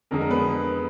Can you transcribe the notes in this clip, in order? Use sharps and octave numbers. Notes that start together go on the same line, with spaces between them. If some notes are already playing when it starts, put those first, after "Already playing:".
F2 D3 G#3 A#4
A#4
B3 B4